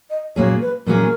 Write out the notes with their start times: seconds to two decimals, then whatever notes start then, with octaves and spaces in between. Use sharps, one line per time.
0.10 D#5
0.36 A#2 F#3 A#3 C#4 G#4 C#5
0.61 B4
0.86 A#2 F#3 A#3 C#4 G#4 A#4